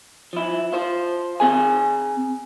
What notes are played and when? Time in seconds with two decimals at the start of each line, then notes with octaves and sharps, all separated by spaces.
0.33 F3 E4
0.73 F4 C5
1.40 C4 G#4 G#5